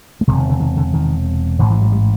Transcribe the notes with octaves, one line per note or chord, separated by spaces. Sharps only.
A3
E1 E2 C3 G#3
D#3
D3
D#3
D3
D#3
A1 G#2 D#3
E3
F#3
G3